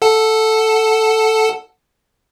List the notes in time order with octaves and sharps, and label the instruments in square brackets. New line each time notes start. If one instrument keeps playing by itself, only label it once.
[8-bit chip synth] A4 F#5 A5